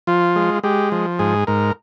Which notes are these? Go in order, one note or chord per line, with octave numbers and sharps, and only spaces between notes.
F3 F4
G#3
G#3 G4
F3
G#2 G#4
G#2 A#4